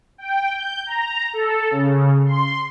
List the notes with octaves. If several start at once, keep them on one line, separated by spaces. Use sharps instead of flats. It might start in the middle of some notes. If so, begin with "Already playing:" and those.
G5
G6
A#5
A4
C#3
C6